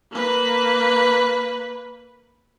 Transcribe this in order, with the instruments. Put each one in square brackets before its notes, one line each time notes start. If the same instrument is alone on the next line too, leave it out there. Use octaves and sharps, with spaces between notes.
[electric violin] A#3 B4